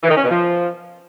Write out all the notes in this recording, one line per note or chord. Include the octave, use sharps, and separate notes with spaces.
E3
D#3
C#4
B2
F3